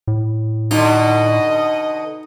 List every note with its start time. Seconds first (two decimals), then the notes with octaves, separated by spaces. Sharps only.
0.08 A2
0.71 B2 D3 D#4 D#5